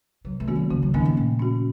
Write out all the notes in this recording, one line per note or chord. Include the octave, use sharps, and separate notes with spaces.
C3 F#3
A3
D#3 A#3 C#4 F#4
F#3
C#3 F3
F#3
D#3 F3 A#3 C#4
C3
A#2 A3
C#4 F#4